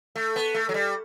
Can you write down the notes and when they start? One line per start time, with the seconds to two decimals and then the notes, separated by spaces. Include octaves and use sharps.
0.16 A3
0.36 B3
0.54 A3
0.69 F#3
0.74 G3